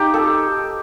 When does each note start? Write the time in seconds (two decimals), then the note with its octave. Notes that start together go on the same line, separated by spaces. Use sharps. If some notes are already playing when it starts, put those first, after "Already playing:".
Already playing: D#4 G4
0.14 A4